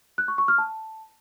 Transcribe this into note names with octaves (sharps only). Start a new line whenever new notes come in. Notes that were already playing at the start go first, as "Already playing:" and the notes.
F#6
C#6
C#6
F6
A5